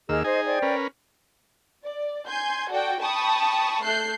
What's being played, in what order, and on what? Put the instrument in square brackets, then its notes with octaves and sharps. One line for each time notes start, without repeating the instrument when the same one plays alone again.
[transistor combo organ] D#2 A#3 E6 [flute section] G#4 D#5 F6
[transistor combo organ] D#4 G#4 G#5 [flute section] C5 D#5
[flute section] C5 D5 G5
[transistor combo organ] C#4 A#4 B4
[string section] D5
G#5 C6 G6
F#4 A4 D5 G5
G5 A5 B5 C#6 D#6
A3 A4 F#6 G6 C7